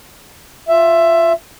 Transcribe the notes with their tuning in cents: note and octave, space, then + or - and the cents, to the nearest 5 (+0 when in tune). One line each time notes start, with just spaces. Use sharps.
F4 +10 E5 +15